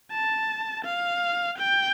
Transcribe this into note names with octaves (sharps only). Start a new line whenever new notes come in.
A5
F5
G5